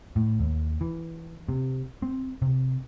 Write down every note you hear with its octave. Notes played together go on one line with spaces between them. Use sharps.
A2
D#2
E3
C3
C4
C3